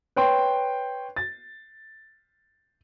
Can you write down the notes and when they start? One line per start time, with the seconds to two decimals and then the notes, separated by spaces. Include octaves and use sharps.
0.16 B4 C#5 G5 C6
1.16 A6